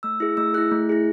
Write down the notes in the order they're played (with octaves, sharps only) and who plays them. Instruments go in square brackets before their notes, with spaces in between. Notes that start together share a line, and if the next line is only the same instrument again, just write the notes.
[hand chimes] A3 E6
E4 G#4
A3 E6
E4 G#4 F#6
A3
E4 G#4